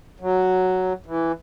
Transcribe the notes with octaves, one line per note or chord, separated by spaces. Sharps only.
F#3
E3